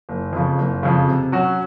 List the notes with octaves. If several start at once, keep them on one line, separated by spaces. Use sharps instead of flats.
F#1
F2 C#3
F#1
F2 C#3
C3
F#3 C#4 F#4